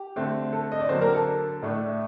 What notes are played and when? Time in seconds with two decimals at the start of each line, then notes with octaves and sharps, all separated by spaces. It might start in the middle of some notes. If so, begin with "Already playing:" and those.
Already playing: G4
0.16 D3 A3 C4
0.53 A4
0.72 D#5
0.80 D5
0.89 D3 F#3 A#3 C4 C5
1.01 A#3 A#4
1.14 A4
1.62 A2 A3 D4